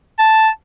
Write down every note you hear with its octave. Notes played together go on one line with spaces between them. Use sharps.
A5